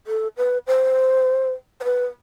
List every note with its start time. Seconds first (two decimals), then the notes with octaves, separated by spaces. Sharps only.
0.07 A4
0.37 B4
0.67 C5
1.80 C5
1.84 B4